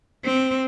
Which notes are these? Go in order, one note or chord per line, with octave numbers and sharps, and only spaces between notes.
C4